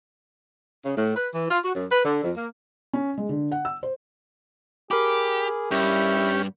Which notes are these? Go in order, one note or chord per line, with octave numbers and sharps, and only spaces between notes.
C#3
A2
B4
E3
F4
F#4
F#2
B4
D3
F2
A#3
C#4
G#3
D3
F#5
E6
C5
G4 G#4 A#4 B5 D6
G2 C#4 E4 G4